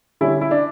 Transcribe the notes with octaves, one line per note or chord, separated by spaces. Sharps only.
D3 G3 C#4 E4
E4
D4